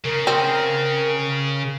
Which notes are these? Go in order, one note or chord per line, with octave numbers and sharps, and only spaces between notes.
C#3 A#4
C4